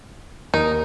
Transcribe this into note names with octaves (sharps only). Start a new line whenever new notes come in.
D#2 D#4 A#4